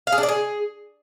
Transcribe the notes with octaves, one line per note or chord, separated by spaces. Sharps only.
F5
G#4
D4
D5
G#4